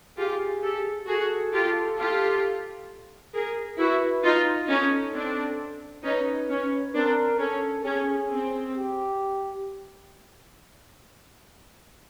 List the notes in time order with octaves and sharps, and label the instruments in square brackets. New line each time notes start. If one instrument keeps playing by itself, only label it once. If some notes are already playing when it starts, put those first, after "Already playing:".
[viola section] F4 G4 [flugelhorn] G#4
[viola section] G4 A4
[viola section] F#4 G#4 [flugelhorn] A4
[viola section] F4 G4
F4 G4
G#4 A#4
[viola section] E4 F#4 [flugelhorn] B4
[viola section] D#4 F4
[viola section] C#4 D#4 [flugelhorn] A4
[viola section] C4 D4
[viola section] C#4 D#4 [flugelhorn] B4
[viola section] C#4
[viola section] C4 D4 [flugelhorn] A#4
[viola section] C#4 [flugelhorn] A4
[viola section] C#4 [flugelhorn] G#4
[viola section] C4
[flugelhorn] G4